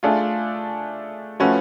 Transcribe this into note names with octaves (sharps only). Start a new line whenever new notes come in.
A3 D4 F4 G#4
F3 A3 C#4 F#4 B4